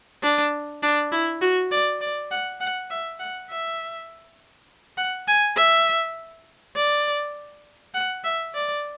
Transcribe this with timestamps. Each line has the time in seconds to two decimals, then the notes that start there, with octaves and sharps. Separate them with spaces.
0.23 D4
0.83 D4
1.12 E4
1.41 F#4
1.71 D5
2.01 D5
2.31 F#5
2.61 F#5
2.90 E5
3.20 F#5
3.50 E5
4.98 F#5
5.28 G#5
5.57 E5
6.76 D5
7.95 F#5
8.24 E5
8.54 D5